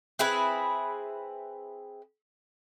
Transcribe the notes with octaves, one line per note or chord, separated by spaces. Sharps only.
C4 E4 G#4 B4